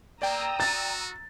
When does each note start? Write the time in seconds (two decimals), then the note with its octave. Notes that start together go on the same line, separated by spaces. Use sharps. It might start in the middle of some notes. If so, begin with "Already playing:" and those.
0.22 A#3 D5 G5 A#5 D#6 E6
0.60 F#4 A6